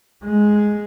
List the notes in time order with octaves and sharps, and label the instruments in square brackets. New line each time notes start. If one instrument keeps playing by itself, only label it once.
[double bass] G#3